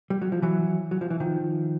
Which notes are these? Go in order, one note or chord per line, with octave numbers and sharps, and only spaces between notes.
G3
F#3
F3
E3 F#3
F#3
F3
E3
D#3 F3